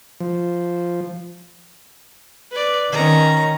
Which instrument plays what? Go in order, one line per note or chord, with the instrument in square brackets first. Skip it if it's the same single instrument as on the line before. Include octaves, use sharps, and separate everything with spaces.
[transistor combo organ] F3
[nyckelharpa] B4 D5
[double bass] D#3 [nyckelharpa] C#4 A#5